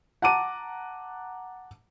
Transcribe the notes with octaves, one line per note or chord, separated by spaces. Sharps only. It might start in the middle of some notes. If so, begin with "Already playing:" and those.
F#5 A5 A#5 D6 D#7